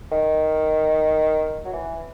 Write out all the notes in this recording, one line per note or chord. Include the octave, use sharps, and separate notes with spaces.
D#3
F#3
E3